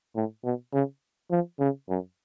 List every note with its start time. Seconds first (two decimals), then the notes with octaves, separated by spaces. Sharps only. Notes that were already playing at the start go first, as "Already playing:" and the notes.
0.16 A2
0.44 B2
0.73 C#3
1.31 F3
1.60 C#3
1.89 F#2